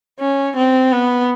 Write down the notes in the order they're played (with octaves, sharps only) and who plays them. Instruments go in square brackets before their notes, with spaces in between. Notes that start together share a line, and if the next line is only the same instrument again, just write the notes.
[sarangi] C#4
C4
B3